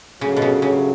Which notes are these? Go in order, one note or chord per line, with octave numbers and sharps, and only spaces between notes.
G2 C#3 F#3 A3
B2
C#3
C#3